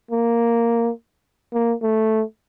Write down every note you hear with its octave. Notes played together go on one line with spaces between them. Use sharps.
A#3
A#3
A3